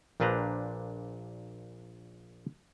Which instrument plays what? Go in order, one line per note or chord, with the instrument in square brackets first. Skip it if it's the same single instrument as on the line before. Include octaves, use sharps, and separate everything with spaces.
[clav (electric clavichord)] A#1 A#2 D4 B4 C5 A#5